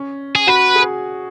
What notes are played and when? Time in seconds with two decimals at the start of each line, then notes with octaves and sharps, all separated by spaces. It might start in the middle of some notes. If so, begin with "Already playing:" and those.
Already playing: C#4
0.35 G#4
0.47 F#4 B4
0.75 G#4